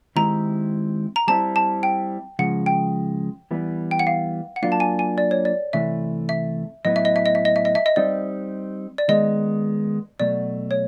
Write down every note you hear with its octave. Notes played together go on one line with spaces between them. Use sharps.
D#3 G#3 C4 E4 G4 A#5
A#5
G3 C4 E4 A5
A5
G5
C#3 F3 G#3 F#5
G5
E3 G3 B3 E4
G5
F#5
F5
F#5
F#3 A#3 D4 F4 F5
A5
G#5
G#5
D5
C#5
D5
C3 E3 A3 E5
E5
A2 F#3 B3 E4 D#5
E5
D#5
E5
D#5
E5
D#5
E5
D#5
E5
D#5
G3 C4 D#4 G4 D5
D5
D#3 G#3 B3 D#5
B2 F#3 A3 D5
C#5